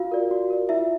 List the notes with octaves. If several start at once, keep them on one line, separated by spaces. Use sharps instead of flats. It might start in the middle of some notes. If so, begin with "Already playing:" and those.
Already playing: F4 F#4 F5
A#4 D5
F#4
A#4 D5
E4 F4 E5